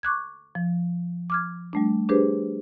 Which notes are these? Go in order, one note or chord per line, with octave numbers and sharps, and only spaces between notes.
C#6 D6 F#6 G#6
F3
D6 F6 G#6
G3 A3 D4
D4 G4 G#4 B4 C5